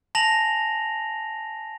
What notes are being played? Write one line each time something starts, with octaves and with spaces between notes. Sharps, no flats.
G#5 A5 A#6 F7 F#7